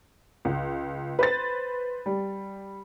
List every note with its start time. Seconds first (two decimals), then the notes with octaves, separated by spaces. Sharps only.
0.45 C#2
1.19 B4 C5 A6
2.06 G3